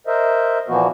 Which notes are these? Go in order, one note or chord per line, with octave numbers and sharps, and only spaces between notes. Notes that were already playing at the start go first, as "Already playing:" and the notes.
A#4 C5 D#5 E5
A#2 E3 F3 A#3 B3 F#4